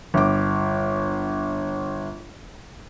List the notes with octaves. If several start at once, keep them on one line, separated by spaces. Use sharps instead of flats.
G1 D6